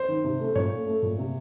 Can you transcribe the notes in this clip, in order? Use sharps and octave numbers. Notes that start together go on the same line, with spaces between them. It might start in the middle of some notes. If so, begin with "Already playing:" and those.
Already playing: C5
D#3
C3
A3
A#2 C#5
A3
A3
A#2
C3